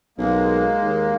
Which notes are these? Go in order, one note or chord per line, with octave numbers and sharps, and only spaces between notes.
B1 G#3 A#3
D#2